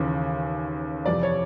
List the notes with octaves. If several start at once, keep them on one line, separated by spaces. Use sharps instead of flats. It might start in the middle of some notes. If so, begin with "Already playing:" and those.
Already playing: D#2 C#3 E3
F2 C3 E3 D5
C#5